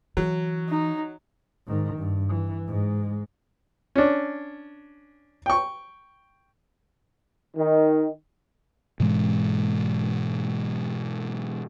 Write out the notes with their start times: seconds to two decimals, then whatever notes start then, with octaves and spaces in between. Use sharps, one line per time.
0.17 E3 F#3
0.69 D#4
1.67 G#2 D#3
1.98 G2
2.29 E3
2.67 G#2 G#3
3.96 C#4 D4
5.46 G5 C#6
7.57 D#3
9.00 G#2 B2 E3 G#3